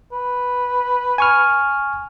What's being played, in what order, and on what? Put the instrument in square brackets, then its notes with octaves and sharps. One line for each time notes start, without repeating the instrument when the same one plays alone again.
[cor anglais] B4
[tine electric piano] G#5 C#6 F6